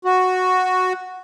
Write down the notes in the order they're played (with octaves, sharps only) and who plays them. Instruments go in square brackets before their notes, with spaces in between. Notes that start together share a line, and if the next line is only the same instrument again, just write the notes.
[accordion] F#4